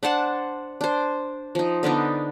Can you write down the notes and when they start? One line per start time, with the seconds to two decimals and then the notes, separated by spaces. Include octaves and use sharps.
0.03 D4 C5 F#5 A5
0.81 D4 C5
1.55 F3 D#4
1.83 D3 B3 D4 D#4